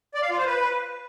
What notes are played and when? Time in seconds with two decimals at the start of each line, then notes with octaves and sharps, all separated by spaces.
0.14 D5
0.22 F5
0.30 F4
0.38 C5
0.46 B4